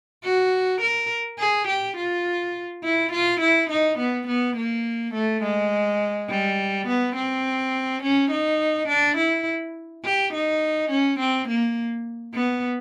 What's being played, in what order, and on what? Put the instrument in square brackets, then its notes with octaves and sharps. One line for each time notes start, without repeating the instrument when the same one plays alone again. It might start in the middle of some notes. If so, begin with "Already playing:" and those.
[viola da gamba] F#4
A#4
G#4
G4
F4
E4
F4
E4
D#4
B3
B3
A#3
A3
G#3
G3
B3
C4
C#4
D#4
D4
E4
G4
D#4
C#4
C4
A#3
B3